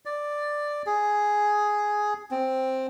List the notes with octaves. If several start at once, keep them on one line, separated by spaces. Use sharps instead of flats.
D5
G#4
C4